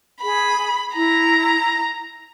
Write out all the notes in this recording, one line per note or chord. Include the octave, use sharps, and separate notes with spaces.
G#4 B5
E4 A#5